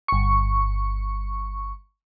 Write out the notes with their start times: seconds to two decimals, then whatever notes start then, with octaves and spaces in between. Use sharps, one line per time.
0.08 G1 C#6